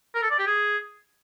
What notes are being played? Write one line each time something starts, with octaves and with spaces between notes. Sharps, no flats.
A#4
A4
D5
G4
G#4